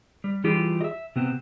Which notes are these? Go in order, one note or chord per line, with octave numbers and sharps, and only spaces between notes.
G3
E3 G3 F4 G4 G#4
D#5 E5
C3 B3 C4